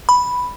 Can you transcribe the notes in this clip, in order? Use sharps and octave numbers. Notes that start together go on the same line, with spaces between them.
B5